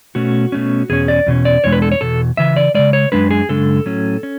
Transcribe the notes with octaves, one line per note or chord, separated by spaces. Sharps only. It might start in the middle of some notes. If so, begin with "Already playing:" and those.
B2 A3 C#4 F#4
B2 A3 C#4
E2 B2 C#4 G#4
D5
E2 B2 C#4
D5
E2 B2 G#3 D4 C#5
B4
A4
C#5
E2 B2 A4
C#3 E3 E5
D5
C#3 E3 G#3 D5
C#5
F#2 C#3 G#3 D4 B4
G#4
F#2 C#3 G#3 D4 A4
A2 F#3 C#4
C#4